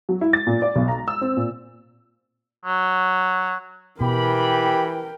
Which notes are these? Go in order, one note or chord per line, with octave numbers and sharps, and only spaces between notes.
F#3
E4
A6
A#2
D5
B1
A#5
E6
C4
A#2
F#3
B2 E3 G4 A#4 G5 B5